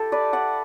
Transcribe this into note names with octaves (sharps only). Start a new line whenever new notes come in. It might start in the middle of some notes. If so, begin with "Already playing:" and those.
Already playing: E4 G4 A4
B4 D5
D5 F#5